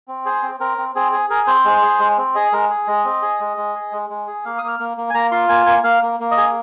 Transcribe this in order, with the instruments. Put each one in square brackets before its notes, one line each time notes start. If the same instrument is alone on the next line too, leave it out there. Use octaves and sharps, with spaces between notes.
[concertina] C4
G#4 C5
C4
C4 A#4
C4
C4 G#4
G#4
G#4 A#4
C4 C5
G#3
G#4
G#3
C4
G#4 D#5
G#3 A#4
G#4
G#3 D#5
C4
G#4
G#3
G#3
G#4
G#3
G#3
G#4
A#3 F5
D#6
A#3
F6
A#3
A#3
G#5
A#3 A#5
F4 C6
A#3 G#5
A#3 G#5
A#3 F5
A#3
A#3
D#5
G#4